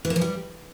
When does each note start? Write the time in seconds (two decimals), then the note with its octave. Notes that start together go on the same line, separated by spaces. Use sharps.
0.05 E3
0.10 A#3
0.16 F3
0.21 G3